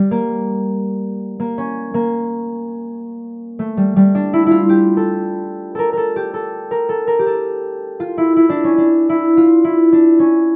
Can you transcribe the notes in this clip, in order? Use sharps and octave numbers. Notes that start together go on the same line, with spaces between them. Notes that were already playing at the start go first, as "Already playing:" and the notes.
Already playing: G3
A#3
A#3
C#4
A#3
A3
G3
G3
D4
E4
E4 F4
G4
A4
A4 A#4
A4 A#4
G4
A4
A#4
A4
A#4
G4
A4
F4
E4
E4
D4
C#4
D4
E4
F4
E4
D4
C#4